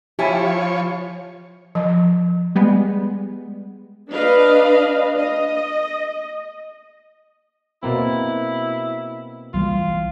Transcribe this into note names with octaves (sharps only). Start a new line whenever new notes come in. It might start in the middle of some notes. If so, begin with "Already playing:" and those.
F3 E4 G4 C#5 G#5 A5
F3
G3 G#3 B3
D4 B4 D#5 F5
D#5
B2 A#3 C4 E4
B1 E3 G3 F4